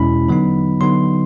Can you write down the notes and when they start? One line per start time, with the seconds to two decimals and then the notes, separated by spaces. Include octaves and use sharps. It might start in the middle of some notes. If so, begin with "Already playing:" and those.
Already playing: E2 B2 G#3 C#4 E4 B5
0.29 D3 F#3 B3 D#4
0.81 D3 F#3 B3 D#4 C6